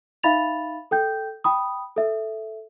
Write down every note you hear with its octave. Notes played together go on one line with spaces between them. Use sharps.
D#4 E5 F5 B5 A6 F7
A4 G5 G6
G5 B5 D#6
A4 E5